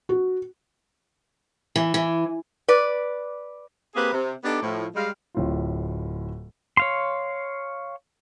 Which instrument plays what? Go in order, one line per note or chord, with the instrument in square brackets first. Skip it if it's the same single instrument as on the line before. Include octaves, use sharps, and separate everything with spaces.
[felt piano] F#4
[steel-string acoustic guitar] E3
E3
[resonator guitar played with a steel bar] B4 D5
[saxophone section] A#3 C4 G4 G#4 B4
C3
B3 D4 D#4 G4 A4 D5
A2 F3
G3 G#3 F5
[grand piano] D1 A2 F4
[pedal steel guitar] C#5 F5 C6